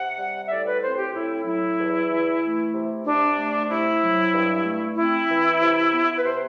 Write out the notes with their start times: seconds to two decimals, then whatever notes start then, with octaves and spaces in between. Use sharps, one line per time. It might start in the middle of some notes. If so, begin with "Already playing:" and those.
Already playing: C3 F#5
0.18 G3
0.47 E5
0.50 A2 D5
0.66 B4
0.82 C4 C5
0.98 G4
1.14 A2 E4
1.45 F#3 E4
1.78 E2
2.10 E3
2.42 A3
2.73 C3
3.05 C3 D4
3.38 A3
3.69 C3 E4
4.02 F#3
4.33 G2
4.65 A3
4.96 C4 E4
5.29 E3
5.60 C3
5.92 B3
6.18 B4
6.24 C3 C5